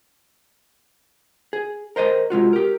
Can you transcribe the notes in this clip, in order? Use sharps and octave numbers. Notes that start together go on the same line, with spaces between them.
G#4
A#4 C5 D#5 A5 A#5
C3 G#3 F4 F#4
G4 A#4